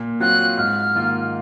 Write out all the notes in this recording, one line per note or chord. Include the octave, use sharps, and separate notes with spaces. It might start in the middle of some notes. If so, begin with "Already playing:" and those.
Already playing: A#2
F#3 C4 F4 F#6
G#2 F6
D#3 A#3 F4